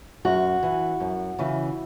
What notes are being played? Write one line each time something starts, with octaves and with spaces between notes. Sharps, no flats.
F#2 F#4
E3
F#2
C#3 E3